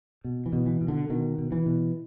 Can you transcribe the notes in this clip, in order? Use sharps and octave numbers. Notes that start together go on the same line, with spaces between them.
B2
E3
B2
E3
B2
D3
B2 D#3
B2
E3
B2